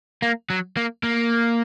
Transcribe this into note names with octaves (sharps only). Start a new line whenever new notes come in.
A#3
F#3
A#3
A#3